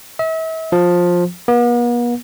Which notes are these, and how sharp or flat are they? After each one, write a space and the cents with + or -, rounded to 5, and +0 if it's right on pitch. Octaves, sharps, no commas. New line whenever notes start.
E5 -40
F3 +15
B3 -45